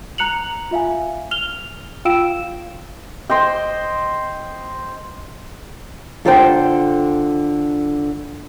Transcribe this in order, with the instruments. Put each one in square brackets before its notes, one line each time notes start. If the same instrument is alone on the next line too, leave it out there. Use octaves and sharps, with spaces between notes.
[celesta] A#5 F#6 C#7 F7 F#7
F4 E5 F5 G#5
F6 F7 G7
F4 F5 G5 E6 D7 E7
[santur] C5 D#5 G5
[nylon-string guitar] D3 F4 A4 C5 C#5 G5